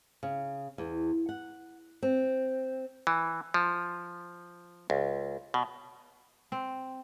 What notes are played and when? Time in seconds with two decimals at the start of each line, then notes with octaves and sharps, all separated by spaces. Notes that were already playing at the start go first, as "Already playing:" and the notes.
0.23 C#3
0.78 E2
1.29 F#5
2.03 C4
3.07 E3
3.54 F3
4.90 C#2
5.54 B2
6.52 C4